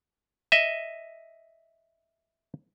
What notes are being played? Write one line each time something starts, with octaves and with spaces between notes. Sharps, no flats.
D#5 E5